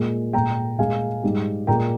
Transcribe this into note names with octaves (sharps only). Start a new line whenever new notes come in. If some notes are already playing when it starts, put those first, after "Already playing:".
Already playing: A#2 G#3
A#2 G#3 G5 A#5
A#2 G#3 F5 G#5
G#2 G3
A#2 G#3 G5 A#5